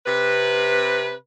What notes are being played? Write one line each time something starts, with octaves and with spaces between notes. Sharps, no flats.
C3 B4